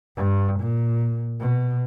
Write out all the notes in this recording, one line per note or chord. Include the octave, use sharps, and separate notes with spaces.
G2
A#2
B2